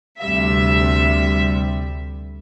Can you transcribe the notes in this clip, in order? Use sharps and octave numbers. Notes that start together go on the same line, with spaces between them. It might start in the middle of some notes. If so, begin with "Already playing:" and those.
D2 C3 G3 E5